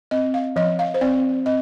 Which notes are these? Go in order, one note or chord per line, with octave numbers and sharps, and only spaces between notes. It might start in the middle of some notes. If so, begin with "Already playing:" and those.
C4 D#5
F5
F3 D#5
F5
C5
C4 D5
C4 D#5